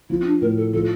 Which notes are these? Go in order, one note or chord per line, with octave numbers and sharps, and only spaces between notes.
F3 E4
C4
D4
A2 A#4
A4
F3 A4